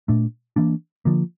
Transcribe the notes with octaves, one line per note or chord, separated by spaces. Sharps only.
A#2 A3 D4
E3 A#3 D4
D3 F3 A#3